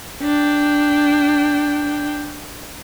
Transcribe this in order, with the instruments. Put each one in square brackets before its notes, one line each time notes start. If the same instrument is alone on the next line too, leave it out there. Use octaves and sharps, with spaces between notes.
[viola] D4 G5